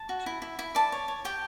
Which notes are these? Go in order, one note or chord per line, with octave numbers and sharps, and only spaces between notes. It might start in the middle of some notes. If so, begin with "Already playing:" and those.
Already playing: A5
F#4
E4
E4
E4
D5 A5
C#5
C#5
G4 G5